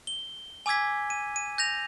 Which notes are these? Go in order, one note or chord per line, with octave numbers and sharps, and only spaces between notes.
G7
G#5 D6 E6 G#6 B6
D#7
D#7
G6 A#6 F7